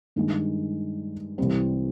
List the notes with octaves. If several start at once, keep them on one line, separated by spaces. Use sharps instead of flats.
G2 D#3 G#3
C2 C3 E3 G3 C4